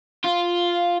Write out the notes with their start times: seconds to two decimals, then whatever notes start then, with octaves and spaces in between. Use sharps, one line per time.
0.24 F4